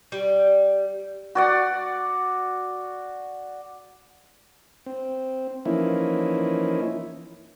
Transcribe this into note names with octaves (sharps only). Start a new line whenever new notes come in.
G3
F#4 D5 F#5
C4
E3 F3 A#3 C#4 D#4 E4